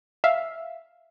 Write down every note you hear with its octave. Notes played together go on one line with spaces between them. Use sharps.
E5 F5